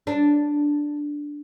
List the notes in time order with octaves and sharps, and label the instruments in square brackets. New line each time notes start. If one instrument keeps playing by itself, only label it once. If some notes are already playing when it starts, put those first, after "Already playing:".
[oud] D4